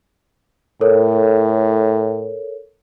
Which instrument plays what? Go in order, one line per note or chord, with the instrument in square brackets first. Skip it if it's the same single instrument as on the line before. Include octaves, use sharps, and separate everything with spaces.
[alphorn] A2 [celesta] A4 A#4 C#5